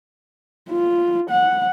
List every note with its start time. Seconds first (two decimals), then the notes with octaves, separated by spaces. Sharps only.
0.70 F4
1.30 F#5